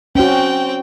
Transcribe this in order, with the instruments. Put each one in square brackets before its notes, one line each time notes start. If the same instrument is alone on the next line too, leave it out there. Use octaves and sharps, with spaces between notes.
[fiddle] C4 G5 [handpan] C#4 F#4